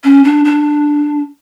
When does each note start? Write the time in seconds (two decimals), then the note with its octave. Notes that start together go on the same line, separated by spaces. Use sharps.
0.04 C#4
0.24 D4
0.45 D4